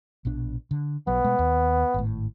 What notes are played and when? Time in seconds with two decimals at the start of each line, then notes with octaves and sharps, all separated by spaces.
0.25 A#1 B2 D4
0.71 D3
1.07 B1 F#3 B3
1.24 B2 G#3 A3
1.39 D#2
1.94 G#1 A2